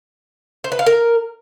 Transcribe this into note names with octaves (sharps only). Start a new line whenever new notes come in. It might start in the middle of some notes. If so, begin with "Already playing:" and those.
C5
B4
F5
A#4